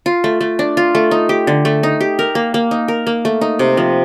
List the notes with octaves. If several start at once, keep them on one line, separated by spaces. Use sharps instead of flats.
F4
A3
A3
D4
F4
A3
D#4
G4
D3
A3
D#4
G4
A#4
A#3
A#3
D#4
A#4
A#3
A3
D#4
C3
F3